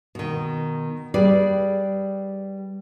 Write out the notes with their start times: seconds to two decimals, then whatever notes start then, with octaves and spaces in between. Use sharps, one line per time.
0.15 B2 D#3
1.14 G3 G#4 B4 D5